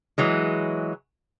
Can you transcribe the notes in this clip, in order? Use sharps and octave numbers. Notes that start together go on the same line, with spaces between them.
E3 F#3 G#3